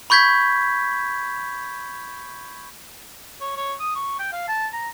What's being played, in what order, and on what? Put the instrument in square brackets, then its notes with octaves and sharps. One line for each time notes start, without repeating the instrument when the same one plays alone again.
[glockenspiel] B5 C#6 G6 G#6 B6
[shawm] C#5
C#5
D#6
C#6
G5
F5
A5
A#5